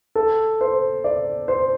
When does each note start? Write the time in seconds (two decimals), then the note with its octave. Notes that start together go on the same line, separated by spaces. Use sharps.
0.15 A4
0.61 C5
1.04 D5
1.48 C5